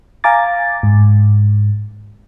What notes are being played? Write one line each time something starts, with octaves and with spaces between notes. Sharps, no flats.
F5 G#5 A#5 D6 A6
G#2